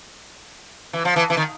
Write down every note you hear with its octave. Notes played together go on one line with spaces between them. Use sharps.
E3
F3
E3
E3
D#3